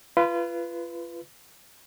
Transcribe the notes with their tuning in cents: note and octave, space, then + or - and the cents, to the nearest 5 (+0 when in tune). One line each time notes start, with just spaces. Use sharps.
F4 -30 B4 +0